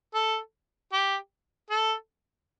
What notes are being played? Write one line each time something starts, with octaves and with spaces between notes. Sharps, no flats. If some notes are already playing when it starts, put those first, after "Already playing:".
A4
G4
A4